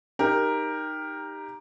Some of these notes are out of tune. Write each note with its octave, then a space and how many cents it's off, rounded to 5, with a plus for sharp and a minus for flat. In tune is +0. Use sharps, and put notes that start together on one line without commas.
D#4 -5 G4 +15 A#4 +5